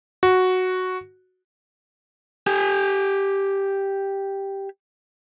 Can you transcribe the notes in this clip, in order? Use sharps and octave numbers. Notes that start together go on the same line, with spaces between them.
F#4
G4 G#5